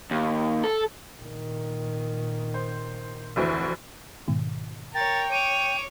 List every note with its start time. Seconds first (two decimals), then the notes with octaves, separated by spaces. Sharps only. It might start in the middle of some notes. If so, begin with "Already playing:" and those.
0.11 D#2
0.63 A4
1.18 A#2 D#3
2.54 C5
3.36 F1 D2 E3
4.28 G#2 B2 D#3
4.95 A#4 C#5 G5 A6
5.32 C#5 D6 D#7